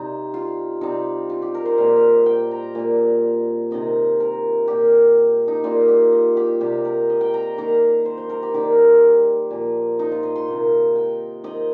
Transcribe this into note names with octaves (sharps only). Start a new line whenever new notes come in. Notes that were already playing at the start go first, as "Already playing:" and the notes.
Already playing: C3 G3 C4 D#4
F4
C3 G3 C4 D#4
F4
G4
A#4
C5
A#2 G3 A#3 F5
D#5
F5
G5
A#5
A#2 A#3
C3 D#3 C4 D#5
A#4
A#2 A#3 G4
D#4
A#2 G3 A#3 F4
G4
D#5
G4
C3 G3 A#3 G4
A#4
D#5
G5
A#5
D#3 A#3 A#5
C5
C5
A#4
G4
D#3 G3 A#3 G4
A#2 F3 A#3
D#4
F4
D#5
C6
C3 D#3 A#3
G5
D#3 C4 D#5